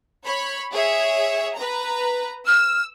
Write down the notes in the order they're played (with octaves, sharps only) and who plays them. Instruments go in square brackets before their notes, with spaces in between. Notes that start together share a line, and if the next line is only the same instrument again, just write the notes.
[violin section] C#5 B5
G#4 C#5 E5
B4 A#5
[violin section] E6 [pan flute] F6